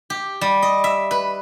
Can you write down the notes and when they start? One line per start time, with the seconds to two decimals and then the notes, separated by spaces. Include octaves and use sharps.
0.10 G4
0.41 G3
0.62 D#5
0.84 E5
1.11 B4